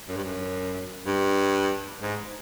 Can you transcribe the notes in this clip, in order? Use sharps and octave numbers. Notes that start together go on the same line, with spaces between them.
F#2
G2
F#2
G2
G#2